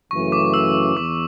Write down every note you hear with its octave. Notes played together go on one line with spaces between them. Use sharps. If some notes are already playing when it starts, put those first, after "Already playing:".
F#2 C#3 E3 A3 C#6
D6
E6
E2 D6